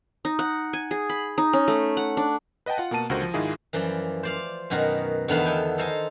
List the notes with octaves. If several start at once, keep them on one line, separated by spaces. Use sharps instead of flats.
D#4
F#5
G#5
G#4
B5
D#4
C#4
A3
F#5
D4
B4 D#5 F#5 G5 A5
F4 F#5
B2 A#3 F#5 A5 D#7
C#2 D3 F#4 A#4 C5 A#6
F3
G#2 D#3 G#3 E4 F4 G#4
F#2 E3 F3 D5
C5 D5 F5
F#2 B2 D#3 F#4 A#4
E2 D3 D#3 A3 B3 F5
A4 G5 G#5
A4 C5 D#5 F5 G#5 A#5